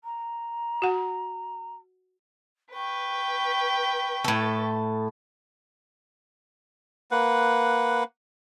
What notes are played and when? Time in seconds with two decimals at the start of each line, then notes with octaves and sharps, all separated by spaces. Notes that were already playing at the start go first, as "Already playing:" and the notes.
0.04 A#5
0.82 F#4 F#5
2.74 B4 G5 C#6
4.24 A2 A4
7.11 A#3 B4 F#5